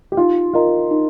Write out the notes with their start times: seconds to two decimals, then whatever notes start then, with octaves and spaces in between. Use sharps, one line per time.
0.12 G4
0.17 D#4 F4
0.53 F4 A#4 D#5 A#5
0.91 D#4